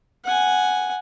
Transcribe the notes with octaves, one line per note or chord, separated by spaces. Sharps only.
F#5 G#5